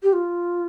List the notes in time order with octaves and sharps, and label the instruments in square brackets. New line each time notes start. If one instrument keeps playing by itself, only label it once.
[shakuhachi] G4
F4